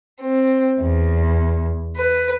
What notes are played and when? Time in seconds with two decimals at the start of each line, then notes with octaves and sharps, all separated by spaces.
0.23 C4
0.79 E2
1.96 B4